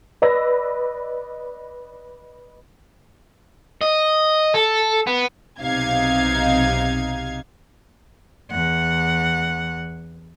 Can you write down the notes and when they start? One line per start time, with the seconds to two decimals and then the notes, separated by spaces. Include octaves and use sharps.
0.22 B4 D5 D#5 B5 E6 A#6
3.81 D#5
4.54 A4
5.07 B3
5.59 B1 C3 D#4 F5 G#6
8.51 E2 F#5